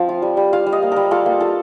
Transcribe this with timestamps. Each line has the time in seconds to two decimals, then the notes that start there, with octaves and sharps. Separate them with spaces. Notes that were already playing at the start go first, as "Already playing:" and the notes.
Already playing: F3 C4
0.09 F4
0.22 G3
0.37 G3
0.53 F4 F5
0.67 G3
0.72 D#5
0.82 A#3
0.92 G3 A#4
1.11 F4 A4
1.26 A#3
1.40 F4 A4